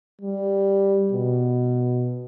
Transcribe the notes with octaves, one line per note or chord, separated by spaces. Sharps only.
G3
B2